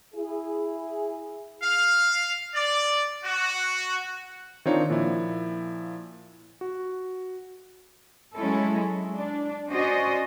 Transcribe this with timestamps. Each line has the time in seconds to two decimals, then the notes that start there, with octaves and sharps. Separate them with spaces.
0.14 E4 G#4
1.62 F5
2.55 D5
3.23 F#4
4.65 D#3 C4 D4 D#4 F4 C#5
4.90 A#2 F3 E4
6.61 F#4
8.36 F#3 G#3 C#4 E4 A4
8.78 G#3
9.15 D4
9.70 C#4 F#4 C5 D5 D#5